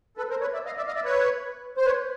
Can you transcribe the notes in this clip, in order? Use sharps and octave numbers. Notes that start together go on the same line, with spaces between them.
A4 B4
A#4 C5
B4 C#5
D5 E5
D#5 F5
D5 E5
D#5 F5
D5 E5
B4 C#5
C5
B4 C#5